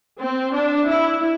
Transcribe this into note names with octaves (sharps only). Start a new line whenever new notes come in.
C4
D4
E4